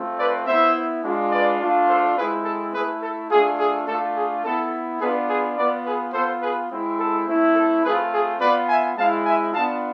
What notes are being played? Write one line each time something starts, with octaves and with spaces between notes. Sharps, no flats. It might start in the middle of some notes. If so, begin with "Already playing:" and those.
Already playing: A3 C4 F4
B4 D5
B3 E4 C5 E5
G#3 D4 F4
B4 D5
A3 D4 F4
A4 C5
G#3 C4 E4 G#4 B4
A4
A3 E4 G#4 B4
A4
A3 D4 F4 G#4
G#4
A3 D4 F4 A4
G#4
B3 E4 A4
B3 D4 F4 G#4 B4
G#4 B4
B3 F4 B4 D5
G#4 B4
B3 F4 A4 C5
G#4 B4
G#3 C4 E4
A4
A3 C4 E4
A4
A3 C4 F4 G#4 B4
G#4
B3 F4 B4 D5
E5 G#5
G#3 C4 E4 F5 A5
E5 G#5
B3 D4 F4 F5 A5